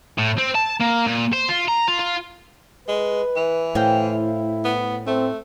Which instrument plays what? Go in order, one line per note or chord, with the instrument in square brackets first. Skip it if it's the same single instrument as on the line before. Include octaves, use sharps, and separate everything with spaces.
[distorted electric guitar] A2
C4
A5
A#3
A#2
C5
F4
A#5
F4
F4
[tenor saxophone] G#3 [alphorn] B4
[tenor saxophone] E3
[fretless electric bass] A2 [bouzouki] C5 F5 G5
[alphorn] E4
[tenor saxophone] B3
[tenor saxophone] A3 [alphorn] C4